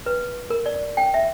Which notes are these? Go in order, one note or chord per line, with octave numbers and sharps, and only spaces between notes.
B4
A#4
D5
G5
E5